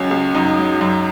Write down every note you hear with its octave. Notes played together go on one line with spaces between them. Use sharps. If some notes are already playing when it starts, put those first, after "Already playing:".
Already playing: C#2 F#3 C#4
C#2
F#2 D#4
F#3
F#2